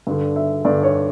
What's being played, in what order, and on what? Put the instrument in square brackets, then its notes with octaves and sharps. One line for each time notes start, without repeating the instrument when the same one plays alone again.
[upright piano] G2 D3
E5
G2 D3 D5
C#5